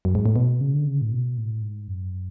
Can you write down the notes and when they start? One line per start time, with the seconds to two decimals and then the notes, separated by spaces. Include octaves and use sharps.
0.05 F#2
0.15 G#2
0.26 A2
0.36 B2
0.61 C#3
0.74 D3
0.87 C#3
1.01 A2
1.12 B2
1.37 A2
1.62 G#2
1.88 F#2